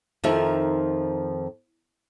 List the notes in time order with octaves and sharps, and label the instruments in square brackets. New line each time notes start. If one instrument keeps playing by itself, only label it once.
[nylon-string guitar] F2 D#3 F3 D#4 A#4 E5